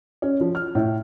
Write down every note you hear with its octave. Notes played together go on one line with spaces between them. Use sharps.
C#4
F3
F6
A2